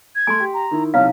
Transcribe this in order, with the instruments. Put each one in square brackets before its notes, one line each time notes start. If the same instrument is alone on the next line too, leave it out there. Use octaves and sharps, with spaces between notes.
[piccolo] G#6
[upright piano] A3 [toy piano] G#5 C6
[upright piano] G4
[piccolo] A#5
[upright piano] D#3 E4
[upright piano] B1 C3 [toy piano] E4 C#5 F5 [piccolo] F6